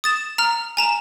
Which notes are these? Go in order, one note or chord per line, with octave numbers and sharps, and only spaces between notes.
D#6 A6 E7
A#5 F6
G#5 A#5 E7